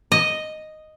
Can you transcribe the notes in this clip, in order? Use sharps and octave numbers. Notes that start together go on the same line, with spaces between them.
D#5